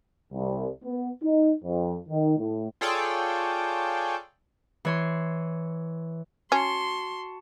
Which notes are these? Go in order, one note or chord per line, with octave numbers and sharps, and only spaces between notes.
C2
B3
D#4
F2
D#3
A2
F4 G#4 A4 C#5 D5 G5
E3 C#5 C6
C#4 F#4 A5 C6 C#7